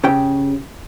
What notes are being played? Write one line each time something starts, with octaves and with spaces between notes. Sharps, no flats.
C#3 G4 G5